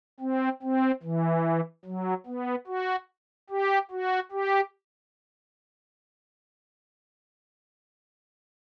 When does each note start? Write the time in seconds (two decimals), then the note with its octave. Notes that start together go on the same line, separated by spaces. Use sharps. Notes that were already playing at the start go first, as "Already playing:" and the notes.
0.20 C4
0.62 C4
1.03 E3
1.85 F#3
2.27 B3
2.67 F#4
3.50 G4
3.91 F#4
4.32 G4